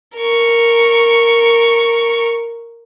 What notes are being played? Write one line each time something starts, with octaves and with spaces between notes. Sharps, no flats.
A#4 C#6